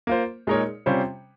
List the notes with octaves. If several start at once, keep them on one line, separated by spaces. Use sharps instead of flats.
A#3 F4 C5
A#2 G#3 D#4 A#4 C#5
C3 G3 C#4 F4 C5